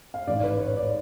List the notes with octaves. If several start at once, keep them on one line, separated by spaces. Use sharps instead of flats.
F5
A1 G#2 D5
B4
C#5
D5